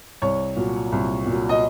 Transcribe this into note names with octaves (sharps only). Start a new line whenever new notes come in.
C2 C#5
A#2 F#3
C2
A#2
F#3
D#5